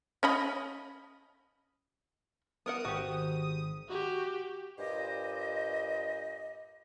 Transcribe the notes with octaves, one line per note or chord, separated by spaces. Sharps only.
C#4 D#5 B5
B3 A#4 F#5 D#6
G#1 F#4 G4
F#4 G4
G2 A#2 G4 C5 D#5